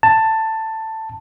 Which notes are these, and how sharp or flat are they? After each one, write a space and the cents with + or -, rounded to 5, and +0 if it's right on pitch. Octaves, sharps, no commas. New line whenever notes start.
A5 +10